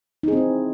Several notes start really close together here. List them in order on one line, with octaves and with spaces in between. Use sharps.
D#4 G#4 C4 E4